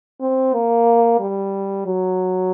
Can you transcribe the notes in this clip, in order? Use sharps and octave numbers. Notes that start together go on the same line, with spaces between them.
C4
A#3
G3
F#3